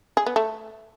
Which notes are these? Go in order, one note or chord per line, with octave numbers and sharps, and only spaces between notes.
G#4
B3
A3